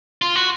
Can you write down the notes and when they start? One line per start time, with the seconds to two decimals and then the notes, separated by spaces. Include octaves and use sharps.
0.22 F4
0.36 F#4